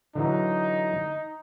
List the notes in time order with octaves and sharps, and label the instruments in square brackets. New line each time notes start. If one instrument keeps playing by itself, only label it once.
[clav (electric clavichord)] D3 E3 F#3 [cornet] D#4